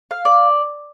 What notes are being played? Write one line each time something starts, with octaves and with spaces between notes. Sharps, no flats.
F5
D5